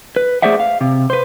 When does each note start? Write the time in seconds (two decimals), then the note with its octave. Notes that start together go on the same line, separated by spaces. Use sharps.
0.16 B4
0.42 A3 G#4 C5 D5 E5 F#5
0.60 F5
0.81 C3
1.10 B4 C5